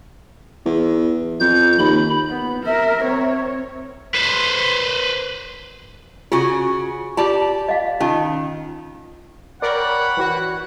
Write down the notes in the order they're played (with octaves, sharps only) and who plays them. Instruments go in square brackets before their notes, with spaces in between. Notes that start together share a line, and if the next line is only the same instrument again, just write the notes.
[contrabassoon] E2
[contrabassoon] F2 [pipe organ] G6
[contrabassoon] D#2 [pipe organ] B5
[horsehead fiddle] B3
A#4 E5
C4 C#5
[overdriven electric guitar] B4 C5
[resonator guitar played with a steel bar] C#3 F#4 G#5 [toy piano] F4
[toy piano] F4 [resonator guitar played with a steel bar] G4 D5 A5
[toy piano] D#5 F5
[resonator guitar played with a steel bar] D#3 [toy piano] C#4 F4 A5
[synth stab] A#4 D5 [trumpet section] C#5 G5 B5 [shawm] F#5
[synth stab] E3 F#4